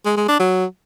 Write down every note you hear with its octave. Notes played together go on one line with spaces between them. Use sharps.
G#3
G#3
D4
F#3